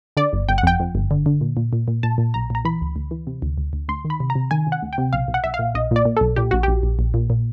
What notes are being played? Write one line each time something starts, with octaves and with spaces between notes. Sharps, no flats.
D3 D5
G1
G1 G5
F#5
F2 G5
F2
G1
D3
D3
A#2
A#2
A#2
A#2
A#2 A5
A#2
B1 A#5
A#2 A#5
E3 B5
D2
D2
E3
C3
D2
D2
D2
D2 C6
D#3
B5
C3
A#5
C3
D#3 G#5
C3
F#5
D2
G5
C3
B1 F5
B1
F#5
B1 E5
F5
A#2
B1 D#5
A#2 D5
A#2
B1 A4
A#2 G4
A#1 F#4
A#1 G4
A#1
A#1
A#2
A#2